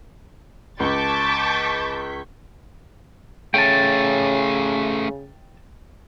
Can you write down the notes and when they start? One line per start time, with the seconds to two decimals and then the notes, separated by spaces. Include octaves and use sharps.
0.80 C#2 A5 C#6 D6 G6 A6 B6
3.54 C#3 A3 C#4 G5 A5